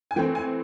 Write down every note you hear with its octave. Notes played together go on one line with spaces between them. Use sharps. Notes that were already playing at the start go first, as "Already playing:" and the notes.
G#5
E3 A3 C4 G5
G#5